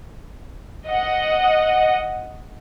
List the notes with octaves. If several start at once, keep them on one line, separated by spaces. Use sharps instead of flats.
D#5 F#5